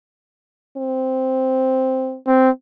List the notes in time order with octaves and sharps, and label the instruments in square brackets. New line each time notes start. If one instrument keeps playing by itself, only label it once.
[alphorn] C4
[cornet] C4